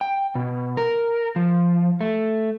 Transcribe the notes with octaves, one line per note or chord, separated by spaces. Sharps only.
G5
B2
A#4
F3
A3